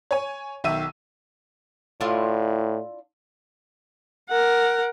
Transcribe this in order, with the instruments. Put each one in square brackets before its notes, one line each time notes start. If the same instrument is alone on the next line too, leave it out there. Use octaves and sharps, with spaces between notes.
[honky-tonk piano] C#5 G#5
B1 D#3 E5 E6 D#7
[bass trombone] A2 [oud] D4 E4 F4
[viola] A#4 F#5